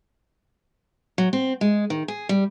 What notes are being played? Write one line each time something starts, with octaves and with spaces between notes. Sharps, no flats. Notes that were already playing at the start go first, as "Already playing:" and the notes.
F#3
C4
G#3
D#3
G#4
G3